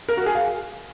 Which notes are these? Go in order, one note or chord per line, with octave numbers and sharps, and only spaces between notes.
A#4
F#4
G#4
F5